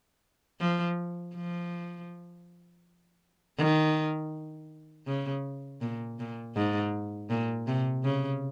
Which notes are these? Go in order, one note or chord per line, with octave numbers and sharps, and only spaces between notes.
F3
F3
D#3
C#3
A#2
A#2
G#2
A#2
C3
C#3